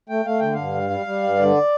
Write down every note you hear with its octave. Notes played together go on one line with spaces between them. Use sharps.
A3 G5
A3 F5
D3 G5
G2 F5
G3
G3
G3
G2
D3 D5